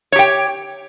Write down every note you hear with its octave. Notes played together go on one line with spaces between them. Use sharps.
G4 C#5 G5